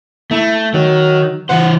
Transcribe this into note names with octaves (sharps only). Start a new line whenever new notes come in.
A3 E4
D#3 F#3
E3 C5 F#5